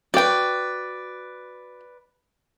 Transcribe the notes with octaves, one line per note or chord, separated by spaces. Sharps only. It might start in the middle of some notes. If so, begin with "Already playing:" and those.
F#4 B4 D5 G5